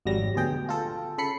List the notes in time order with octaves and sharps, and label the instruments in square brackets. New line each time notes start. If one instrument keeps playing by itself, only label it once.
[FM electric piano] G#1 F2 F#3 G3 A#6
D2 B2 G#4 G5
F4 A4
C#3 A4 B5 C7 C#7